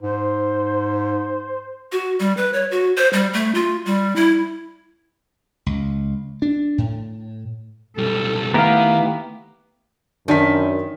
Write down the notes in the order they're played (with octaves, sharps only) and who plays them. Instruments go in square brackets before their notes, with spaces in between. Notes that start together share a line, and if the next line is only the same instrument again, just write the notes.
[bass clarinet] G#2 [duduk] C5
[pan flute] F#4
G3
B4
C#5
F#4
C5
G3
A3
F4
G3
E4
[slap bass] C#2
D4
A2
[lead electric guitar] B1 G3 [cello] A4
[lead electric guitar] D#3 [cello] A3 [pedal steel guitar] B3 E4 G4 [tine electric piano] F5 A#5
[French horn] F#2 [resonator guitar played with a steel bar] D#3 [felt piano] D4 A5 B6